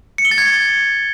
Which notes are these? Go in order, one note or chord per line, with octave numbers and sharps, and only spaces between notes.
C#7
G7
A6
G#6